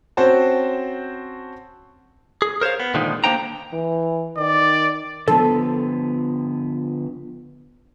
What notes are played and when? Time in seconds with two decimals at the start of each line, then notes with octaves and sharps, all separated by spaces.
0.17 C4 C#4 F#4 C5 A5
2.42 G#4
2.61 A#4 C5 C#5 F5
2.80 B3
2.94 A#2 D3 D#3 F3 G#3 D#4
3.24 D3 A#3 D4 C5 G5 A#5
3.73 E3
4.37 D#3 D5
5.28 D3 F3 B3 A4